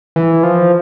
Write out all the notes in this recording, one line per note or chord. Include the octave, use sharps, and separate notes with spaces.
E3
F3